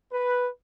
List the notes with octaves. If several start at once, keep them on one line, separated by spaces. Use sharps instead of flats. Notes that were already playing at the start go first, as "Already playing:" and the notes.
B4